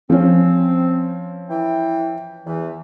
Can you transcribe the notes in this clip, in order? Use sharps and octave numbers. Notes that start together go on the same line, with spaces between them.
F3 C4 C#4
E3 G5
E2 E3